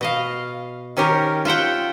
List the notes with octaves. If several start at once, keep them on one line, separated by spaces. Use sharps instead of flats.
B2 D#5 F5
D#3 C#4 G4 A#4
F4 E5 F#5 G5